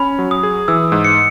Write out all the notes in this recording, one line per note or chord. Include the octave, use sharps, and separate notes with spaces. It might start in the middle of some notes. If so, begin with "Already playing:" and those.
Already playing: C#4 B5
F#3
D#6
G#4
E3 E6
G#2
C#7